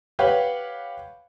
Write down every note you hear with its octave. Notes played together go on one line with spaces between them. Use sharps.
G4 B4 C#5 F5 F#5